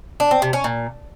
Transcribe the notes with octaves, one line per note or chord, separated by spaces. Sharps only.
D4
C4
C3
C#4
A#2